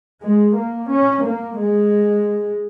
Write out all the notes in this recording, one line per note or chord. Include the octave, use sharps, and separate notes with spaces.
G#3
A#3
C#4
A#3
G#3